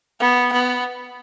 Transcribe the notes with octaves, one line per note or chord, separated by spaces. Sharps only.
B3
B3